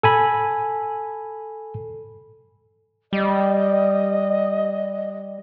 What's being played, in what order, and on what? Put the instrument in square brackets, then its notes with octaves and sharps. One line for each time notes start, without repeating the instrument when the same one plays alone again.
[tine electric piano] A4 G#5 B5
[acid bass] G3 [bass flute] D#5